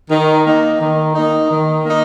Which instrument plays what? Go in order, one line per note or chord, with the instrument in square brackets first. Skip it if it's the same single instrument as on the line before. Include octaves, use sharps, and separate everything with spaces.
[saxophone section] D#3
A#3 D#4
D#3
A#3 D#4
D#3
A#3 D#4